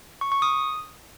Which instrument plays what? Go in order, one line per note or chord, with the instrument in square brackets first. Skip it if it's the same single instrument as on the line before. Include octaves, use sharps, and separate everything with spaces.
[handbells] C#6
C#6
D#6